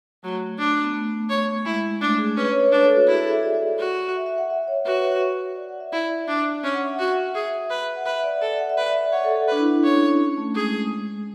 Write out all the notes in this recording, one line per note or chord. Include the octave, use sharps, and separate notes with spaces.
F#3 A3
D4
B3
A3
C#5
G#3 E4
A3 D4
G#4
C#4 B4
C#5
C#5
D4 C#5
A4
F#4
E4 G#4
A4
E5
D5
F#4
E5
E5
F#5
E5
C#5
F#4 B4
D5
F#5
E5
E4 D5
E5
D4
C#4
F#5
E5
F#5
F#4
G#4 E5
B4
F#5
B4 E5
D5
A4 D5
F#5
E5
B4 D5
E5
C#5 F#5
A4
A4
D4 B4
E4
D4
C#4 C#5
C#4
C#4
A3
G#3 G#4
G#3